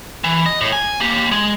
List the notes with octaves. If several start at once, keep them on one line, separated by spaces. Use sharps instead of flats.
E3
D#5
A2
G#5
A#3 G4
G#3